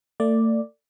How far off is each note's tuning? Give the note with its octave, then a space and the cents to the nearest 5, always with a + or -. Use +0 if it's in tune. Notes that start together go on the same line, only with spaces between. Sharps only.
A3 +35 D5 +0